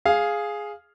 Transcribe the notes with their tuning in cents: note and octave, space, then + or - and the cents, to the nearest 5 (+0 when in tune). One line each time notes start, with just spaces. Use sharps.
G#4 +0 F5 +0